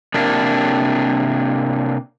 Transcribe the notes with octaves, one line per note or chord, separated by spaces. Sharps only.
C3 A#3 D4